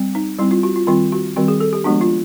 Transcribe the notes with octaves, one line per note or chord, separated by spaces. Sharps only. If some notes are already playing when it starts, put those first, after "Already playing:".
Already playing: G3 C4
D#4
G3 C4 E4
F4
F#4
F4
D#3 G3 C4 F4
F#4
D#3 G3 C4 F#4
G#4
A4
G4
F3 G#3 B3 D4 F#4
F4